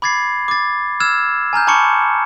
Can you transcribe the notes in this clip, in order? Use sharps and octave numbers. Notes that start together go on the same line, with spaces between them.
B5 D6 G#6 A6 C7
D6 A6
E6 F6 G#6 E7
G#5 A#5 F6 G6
G#5 A5 B5 C#6 D6 C#7